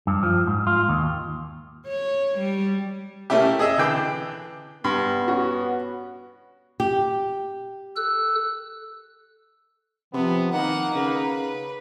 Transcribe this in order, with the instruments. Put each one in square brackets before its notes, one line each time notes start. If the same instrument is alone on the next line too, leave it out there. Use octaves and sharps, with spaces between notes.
[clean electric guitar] G2
F3
G#2
F4
D#2
[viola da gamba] C#5
G3
[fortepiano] A3 A#3 C#4 E4 G4
G#4 D#5 E5
D3 E3 G5 D6
[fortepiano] G2 [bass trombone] B3
[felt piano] C#4 F#4
[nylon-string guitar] G4
[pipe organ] A4 E6 F#6
[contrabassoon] C3 [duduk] F3 [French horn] B3
[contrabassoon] D#3 [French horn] A#3 [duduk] D#4 [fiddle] F#5
[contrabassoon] C#3 [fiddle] B4